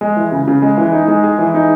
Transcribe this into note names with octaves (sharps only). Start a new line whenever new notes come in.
G#3
E3
C#3
C#3
G#3
E3
D#4
G#3
G#4
E3
D#4